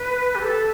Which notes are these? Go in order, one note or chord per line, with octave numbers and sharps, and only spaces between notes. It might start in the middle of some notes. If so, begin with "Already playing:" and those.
Already playing: B4
G4
A4